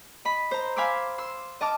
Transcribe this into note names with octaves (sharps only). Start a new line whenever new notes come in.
D#5 B5
C5 A#5
F5 G#5 B5 C6 D6 E6
C6 E6
D#5 A5 D6 F6